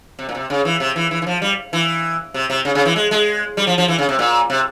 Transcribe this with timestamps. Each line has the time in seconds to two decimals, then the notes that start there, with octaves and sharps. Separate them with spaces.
0.19 C3
0.29 A#2
0.35 C3
0.50 C#3
0.65 E3
0.80 C3
0.96 E3
1.11 E3
1.22 E3
1.27 F3
1.42 G3
1.73 E3
2.34 C3
2.50 C3
2.65 C#3
2.75 C#3
2.85 E3
2.96 G#3
3.11 G#3
3.57 G3
3.67 F3
3.78 F3
3.88 E3
3.98 C#3
4.09 C3
4.19 A#2
4.50 C3